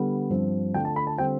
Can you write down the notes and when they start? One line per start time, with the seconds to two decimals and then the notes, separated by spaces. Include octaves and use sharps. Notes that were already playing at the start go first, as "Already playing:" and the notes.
Already playing: D3 G3 B3
0.30 G2 F3 C4
0.74 D3 A3 D4 F4 G5
0.85 A5
0.96 B5
1.07 A5
1.18 D3 G3 C4 F4 G5